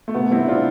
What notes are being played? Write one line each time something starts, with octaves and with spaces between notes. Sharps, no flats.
A3
C3 B3
G3 C4 E4
C3 D4 F4